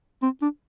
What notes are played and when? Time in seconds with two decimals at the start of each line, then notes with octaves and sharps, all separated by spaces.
0.22 C4
0.42 D4